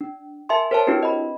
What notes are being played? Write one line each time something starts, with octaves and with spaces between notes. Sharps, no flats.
D4
A#4 E5 G#5 A5 C6
A#4 C5 C#5 G5 A5
C4 D4 E4 F#4 G4 B4
D#5 B5